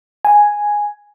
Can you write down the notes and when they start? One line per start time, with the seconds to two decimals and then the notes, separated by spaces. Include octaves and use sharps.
0.25 G#5